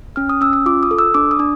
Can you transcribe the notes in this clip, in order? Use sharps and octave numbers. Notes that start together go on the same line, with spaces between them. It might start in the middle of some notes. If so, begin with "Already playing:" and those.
C#4 F6
D#6
C#4 E6
E6
F4 D6
D#6
A4
E6
D4 D6
D#6
D4